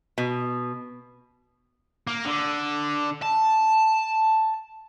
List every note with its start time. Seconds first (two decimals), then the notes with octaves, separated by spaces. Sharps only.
0.18 B2
2.07 A#3
2.25 D3
3.22 A5